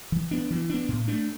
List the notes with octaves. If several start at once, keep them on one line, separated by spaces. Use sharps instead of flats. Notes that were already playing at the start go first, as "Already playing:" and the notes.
E3
B3 D4
E3
B3 D4
A2
A3 D4